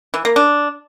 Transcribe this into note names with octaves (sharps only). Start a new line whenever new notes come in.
E3
A#3
D4